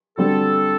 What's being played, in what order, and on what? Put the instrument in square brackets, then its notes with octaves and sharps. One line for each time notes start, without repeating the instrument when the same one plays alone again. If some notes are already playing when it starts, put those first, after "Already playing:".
[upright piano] D3 G3 C4 F#4 [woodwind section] A4